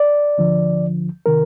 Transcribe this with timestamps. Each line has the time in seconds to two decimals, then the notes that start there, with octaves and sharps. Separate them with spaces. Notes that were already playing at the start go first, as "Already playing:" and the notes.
Already playing: D5
0.38 D2 D3 F3
1.26 C3 D#3 A#4